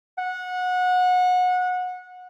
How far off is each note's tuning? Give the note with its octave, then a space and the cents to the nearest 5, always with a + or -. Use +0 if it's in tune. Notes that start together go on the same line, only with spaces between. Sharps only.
F#5 -25